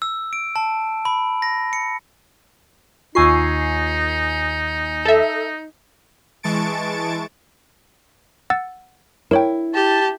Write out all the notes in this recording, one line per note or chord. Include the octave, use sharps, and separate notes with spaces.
E6
D7
A5
B5
A#6
C#7
D#2 D#4 F4 G#5 C#6 E6 C7
A4 E5
E3 G#3 A5 C#6 A6 D7
F#5 E6 A6
E4 A#4 C#5 G5
G4 A5